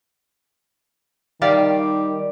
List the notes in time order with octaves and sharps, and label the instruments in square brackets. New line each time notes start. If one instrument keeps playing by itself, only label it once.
[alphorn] D#3 [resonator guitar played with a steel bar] G3 D5 F5